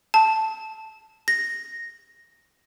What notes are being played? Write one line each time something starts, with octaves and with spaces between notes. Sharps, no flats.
A5
A#6